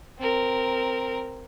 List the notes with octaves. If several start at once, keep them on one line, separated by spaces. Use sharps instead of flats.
C4 A#4